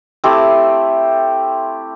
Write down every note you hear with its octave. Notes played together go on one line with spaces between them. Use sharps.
A3 C4 E4 G4